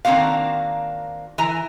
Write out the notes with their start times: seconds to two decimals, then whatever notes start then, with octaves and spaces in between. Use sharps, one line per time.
0.05 D#3 A#3 C4 D4 F#4 F5
1.38 E3 G#5 A#5